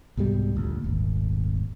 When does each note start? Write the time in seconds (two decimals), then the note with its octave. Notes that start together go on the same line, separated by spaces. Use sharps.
0.17 C2 G#2 B2 G3
0.55 G1 D2 A#2
0.84 D#1 G#1